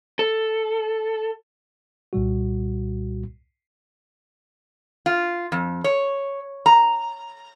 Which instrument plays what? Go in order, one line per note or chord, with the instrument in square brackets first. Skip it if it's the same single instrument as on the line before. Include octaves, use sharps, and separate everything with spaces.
[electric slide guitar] A4
[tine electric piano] C2 A#2 G3 F#4
[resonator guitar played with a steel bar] F4
F2
C#5
A#5